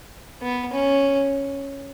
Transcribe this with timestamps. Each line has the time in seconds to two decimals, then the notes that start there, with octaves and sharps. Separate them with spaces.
0.42 B3
0.73 C#4